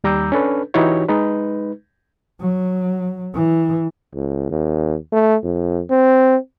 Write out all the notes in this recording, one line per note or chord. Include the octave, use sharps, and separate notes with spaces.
D#2 G3 A#5 D6 E6 G6
C#4 D4 A4 B4
E3 D#4 E4 F#4 G4 C#5
G#3 D#4 B4
F#3
E3
C#2
D#2
A3
F2
C4